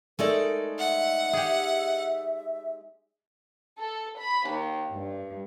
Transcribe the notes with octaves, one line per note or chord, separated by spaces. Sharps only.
G#3 A3 D#4 A4 A#4 D5
E5 F#5
G4 G#4
A4
B5
D#2
G2